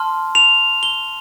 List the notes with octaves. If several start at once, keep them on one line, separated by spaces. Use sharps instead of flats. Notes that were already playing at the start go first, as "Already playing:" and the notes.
Already playing: A5 C6 F6
F7
G7